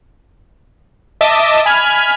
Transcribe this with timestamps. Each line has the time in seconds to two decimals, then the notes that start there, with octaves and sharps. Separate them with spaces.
1.21 D#5 E5 A5 D6
1.66 G#5 B5 F6 G#6